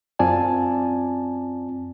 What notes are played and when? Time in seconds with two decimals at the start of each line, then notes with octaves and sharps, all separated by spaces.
0.19 F#2 C4 F4 D5 G#5 A5